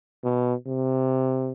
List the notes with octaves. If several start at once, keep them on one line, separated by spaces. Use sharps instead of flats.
B2
C3